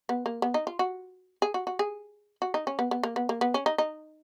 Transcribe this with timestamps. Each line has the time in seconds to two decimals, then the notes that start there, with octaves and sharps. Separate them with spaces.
0.09 B3
0.26 A#3
0.42 B3
0.54 D#4
0.67 F4
0.79 F#4
1.42 G#4
1.54 F#4
1.67 F#4
1.79 G#4
2.42 F#4
2.54 D#4
2.67 C#4
2.79 B3
2.91 B3
3.03 A#3
3.16 B3
3.29 A#3
3.41 B3
3.54 C#4
3.66 D#4
3.78 D#4